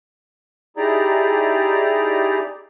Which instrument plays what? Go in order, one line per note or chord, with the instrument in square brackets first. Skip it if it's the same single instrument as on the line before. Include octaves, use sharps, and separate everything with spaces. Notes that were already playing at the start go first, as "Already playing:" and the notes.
[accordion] D#4 E4 G4 G#4 D5 A#5